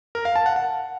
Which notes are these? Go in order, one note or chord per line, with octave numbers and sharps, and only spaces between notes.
A#4
F5
A5
F#5
F#5